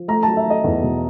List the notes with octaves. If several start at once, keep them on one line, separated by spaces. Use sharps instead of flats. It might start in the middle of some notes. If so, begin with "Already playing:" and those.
Already playing: F3
A3 A#5
F#3 A5
E5
A3 D#5
E2
B2